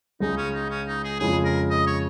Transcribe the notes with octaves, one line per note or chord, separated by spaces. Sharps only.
C#2 C#3 G#3 D#4
C#4
D#4
C#4
D#4
G#4
F2 C#3 G#3 C#4 G#4
A#4
D#5
C#5